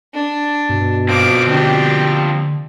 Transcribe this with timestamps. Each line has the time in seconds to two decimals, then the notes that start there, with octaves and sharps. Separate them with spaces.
0.14 D4
0.69 G2 B2
1.09 F3 A#3 C4 D6
1.47 D3 D4 G4